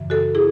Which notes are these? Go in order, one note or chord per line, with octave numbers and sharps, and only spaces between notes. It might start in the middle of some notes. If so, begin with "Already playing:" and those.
Already playing: F#2 C#3 E3
F#4 A4
E4 G#4